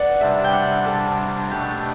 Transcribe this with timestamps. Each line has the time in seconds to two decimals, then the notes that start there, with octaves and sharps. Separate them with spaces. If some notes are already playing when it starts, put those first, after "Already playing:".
Already playing: B4 D5 F#5
0.21 C3 G3 D4 E5
0.44 G5
0.53 F#5
0.86 A4
1.51 B2 A3 D4 G4